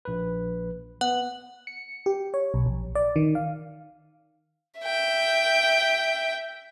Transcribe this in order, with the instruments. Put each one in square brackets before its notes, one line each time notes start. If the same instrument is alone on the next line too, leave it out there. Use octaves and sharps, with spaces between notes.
[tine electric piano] A#1 B4
[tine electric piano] B3 [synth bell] F#5
[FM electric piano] C#7
G4
C#5
B1
A#1
D5
D#3
F5
[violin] E5 G5